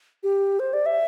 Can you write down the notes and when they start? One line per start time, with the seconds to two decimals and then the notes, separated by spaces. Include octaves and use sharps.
0.23 G4
0.60 C5
0.73 D5
0.86 E5